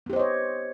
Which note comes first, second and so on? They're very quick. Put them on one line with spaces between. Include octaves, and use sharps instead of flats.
B3 G4 C5 D#5 C#5